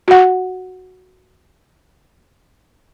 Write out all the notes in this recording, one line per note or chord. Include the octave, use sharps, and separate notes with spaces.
F#4 F#5